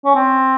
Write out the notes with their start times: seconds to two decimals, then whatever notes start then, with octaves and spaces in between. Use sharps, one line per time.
0.05 C#4
0.15 C4